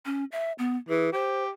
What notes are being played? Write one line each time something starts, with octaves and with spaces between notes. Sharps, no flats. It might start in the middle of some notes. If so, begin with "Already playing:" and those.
C#4
E5
B3
E3 G#4
G4 C5